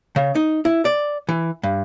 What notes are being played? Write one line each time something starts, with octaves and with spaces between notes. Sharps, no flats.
C#3
D#4
E4
D5
E3
G2